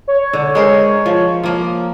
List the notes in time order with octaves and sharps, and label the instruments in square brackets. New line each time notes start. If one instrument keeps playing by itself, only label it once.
[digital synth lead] C#5
[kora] D3
G#3 A#4 C5
F3
F3 A#3